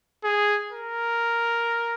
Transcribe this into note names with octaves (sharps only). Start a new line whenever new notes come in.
G#4
A#4